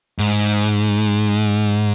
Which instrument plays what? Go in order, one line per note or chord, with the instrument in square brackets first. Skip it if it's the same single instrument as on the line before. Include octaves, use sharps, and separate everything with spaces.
[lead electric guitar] G#2